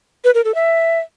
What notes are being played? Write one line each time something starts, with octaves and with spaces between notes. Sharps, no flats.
B4
A#4
A4
E5